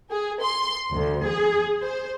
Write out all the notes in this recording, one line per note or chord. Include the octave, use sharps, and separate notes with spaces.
G#4
C6
D2
G#4
C5